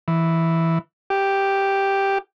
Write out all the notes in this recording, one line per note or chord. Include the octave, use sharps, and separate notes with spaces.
E3
G4